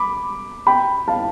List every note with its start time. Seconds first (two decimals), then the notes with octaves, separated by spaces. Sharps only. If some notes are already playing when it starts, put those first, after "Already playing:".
Already playing: B5 D6
0.67 G5 B5
1.08 F5 A5